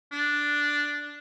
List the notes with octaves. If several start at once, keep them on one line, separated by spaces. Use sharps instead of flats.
D4